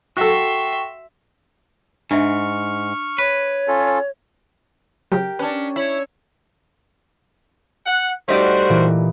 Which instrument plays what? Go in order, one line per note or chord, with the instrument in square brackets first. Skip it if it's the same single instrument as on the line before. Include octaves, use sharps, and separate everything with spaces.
[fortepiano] F#4 A4 [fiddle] E5 C6 [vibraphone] G5 C#6
[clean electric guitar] G#2 [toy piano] D4 E5 [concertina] C#6 F6
[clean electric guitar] B4 [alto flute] C#5
[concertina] C#4 F4 A4
[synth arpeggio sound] C#3 F#3 [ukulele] G4 A#4
[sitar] C#4 D4 [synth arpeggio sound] B4
[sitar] E4 [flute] C#5 [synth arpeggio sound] B5
[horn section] F#5
[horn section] G3 F#4 [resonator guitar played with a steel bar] A3 D#4 D5 [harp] G4 D#5 [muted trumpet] C5
[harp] A#2 E3